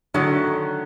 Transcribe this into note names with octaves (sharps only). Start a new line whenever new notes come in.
D3 D#3 F#3 A3